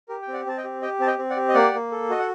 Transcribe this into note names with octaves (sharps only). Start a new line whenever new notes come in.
G4 A#4
G5
C4
D5 F#5
C4 A5
D#5 G5
G4
G4 D#5 G5
C4 A5
D#5 G5
C4
D5 F#5
G4
D#5
A#3 D5 F#5
A#3
A4
F#4 D#5
F#5